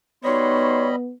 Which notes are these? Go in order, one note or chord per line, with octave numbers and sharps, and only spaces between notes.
G3 B3 D#4 F#4 C#5 D#5 B5 C6